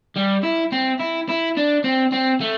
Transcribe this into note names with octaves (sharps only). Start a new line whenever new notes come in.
G3
E4
C4
E4
E4
D4
C4
C4
A3